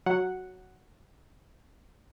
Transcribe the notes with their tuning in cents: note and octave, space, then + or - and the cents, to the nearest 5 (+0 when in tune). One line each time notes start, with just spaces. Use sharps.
F#3 +0 F#5 +0